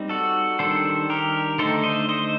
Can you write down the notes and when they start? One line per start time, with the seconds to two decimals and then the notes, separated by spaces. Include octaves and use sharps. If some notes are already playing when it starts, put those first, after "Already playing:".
Already playing: G3 C4 D#4
0.09 F#4 A4
0.59 D#3 G3 D4 A4 C5
1.10 G4 A#4
1.58 D3 A3 D#4 A4 C5
1.84 C5 D#5
2.09 C5 D#5